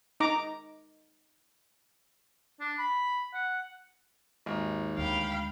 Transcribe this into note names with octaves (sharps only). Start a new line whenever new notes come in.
D#4 A#5 D6
D4
B5
F#5
G#1 D#2
D2 G#3 F5 G5 B5